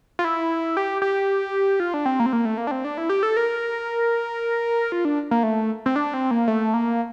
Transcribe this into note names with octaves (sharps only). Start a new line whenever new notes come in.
F4
E4
G4
G4
F4
D4
C4
A#3
C4
A#3
A3
A#3
D4
C4
D4
E4
G4
A4
A#4
F4
D4
A#3
A3
C4
D4
C4
A#3
A3
A#3